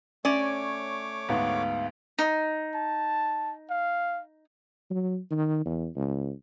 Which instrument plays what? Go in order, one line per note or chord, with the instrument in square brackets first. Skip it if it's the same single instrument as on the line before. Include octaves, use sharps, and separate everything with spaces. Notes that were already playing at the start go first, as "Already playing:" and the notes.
[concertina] A3 C#5 D6 [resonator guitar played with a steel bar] C#4 D5
[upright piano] D2 G#2 B3 [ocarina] F5
[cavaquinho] D#4
[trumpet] A5
F5
[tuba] F#3
D#3
E2
C#2